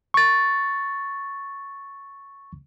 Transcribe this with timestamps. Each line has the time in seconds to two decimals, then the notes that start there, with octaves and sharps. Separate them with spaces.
0.14 C#6 A6